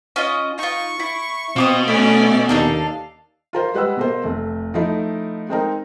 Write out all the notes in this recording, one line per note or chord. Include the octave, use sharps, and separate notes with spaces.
C#4 F4 D#5
D#4 F4 C#6
E4
B2 C4 F4 D6 D#6
A3 C#4 D5 E5
D#2 D4 D#4 A4 F5
F4 A#4 C5
G3 G#3 B4 F#5 E6
B2 A#3 C5
F1 A3
F3 A3 D#4 E4
G#3 C4 D#4 A#4